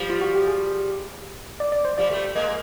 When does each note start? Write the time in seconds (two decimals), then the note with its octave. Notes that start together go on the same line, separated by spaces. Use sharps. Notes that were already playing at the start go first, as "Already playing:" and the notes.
Already playing: F3 G3
0.10 F4
0.21 F#4
0.35 G4
0.48 G#4
1.60 D5
1.72 D5
1.85 C5
1.98 F3 G3 D5
2.10 G3 A3
2.35 G#3 A#3 D#5